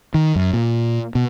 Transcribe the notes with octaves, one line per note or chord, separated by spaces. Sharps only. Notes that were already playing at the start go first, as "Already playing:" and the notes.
D#3
F#2
A#2
B2